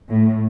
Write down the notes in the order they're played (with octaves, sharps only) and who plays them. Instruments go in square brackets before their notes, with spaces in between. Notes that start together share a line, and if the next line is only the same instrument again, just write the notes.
[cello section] A2